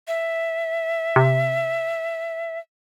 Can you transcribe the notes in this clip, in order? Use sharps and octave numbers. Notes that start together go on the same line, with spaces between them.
E5
C3